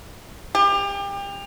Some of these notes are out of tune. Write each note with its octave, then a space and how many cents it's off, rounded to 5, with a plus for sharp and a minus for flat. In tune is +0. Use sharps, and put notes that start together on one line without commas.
G4 +30